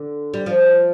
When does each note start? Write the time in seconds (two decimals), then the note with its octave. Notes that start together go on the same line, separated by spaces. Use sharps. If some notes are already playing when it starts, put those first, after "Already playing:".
Already playing: D3
0.34 G3
0.46 F3